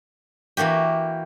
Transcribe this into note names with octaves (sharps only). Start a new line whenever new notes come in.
E3 A#3 F#4 G4